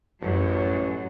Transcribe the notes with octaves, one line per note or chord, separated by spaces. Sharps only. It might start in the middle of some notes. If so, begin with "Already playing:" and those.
A1 F#2